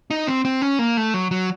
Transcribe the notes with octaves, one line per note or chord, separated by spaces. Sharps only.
D#4
C4
C4
C#4
A#3
A3
F#3
F#3